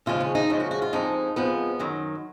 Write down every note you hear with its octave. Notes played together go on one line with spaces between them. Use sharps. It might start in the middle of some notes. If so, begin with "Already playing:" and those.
D#2 C#3 F3 G#3 F4
C#4
D#4
D#2 C#3 F3 G#3 F4
F#4
F#4
F4
F2 F3 G#3 D#4
F2 F3 G#3 B3
F#2 D#3 F#3